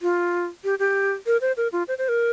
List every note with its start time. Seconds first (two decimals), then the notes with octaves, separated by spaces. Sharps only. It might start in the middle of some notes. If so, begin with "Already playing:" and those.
0.02 F4
0.64 G4
0.79 G4
1.26 A#4
1.41 C5
1.57 A#4
1.72 F4
1.88 C5
1.98 C5
2.09 A#4